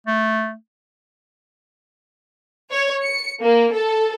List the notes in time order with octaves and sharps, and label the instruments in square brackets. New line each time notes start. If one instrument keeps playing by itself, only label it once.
[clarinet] A3
[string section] C#5
C#7
A#3
A4